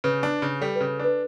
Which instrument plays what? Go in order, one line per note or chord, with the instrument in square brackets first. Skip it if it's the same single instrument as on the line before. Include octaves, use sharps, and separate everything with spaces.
[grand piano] C#3 [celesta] B4
[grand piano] D4
C#3
[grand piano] G3 [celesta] A4
[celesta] B4
[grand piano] C#3
[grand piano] D4 [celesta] B4